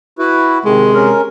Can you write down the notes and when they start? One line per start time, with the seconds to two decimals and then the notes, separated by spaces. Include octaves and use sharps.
0.19 E4 F#4 B4
0.64 C3 D#3 G#3
0.94 C#4 A#4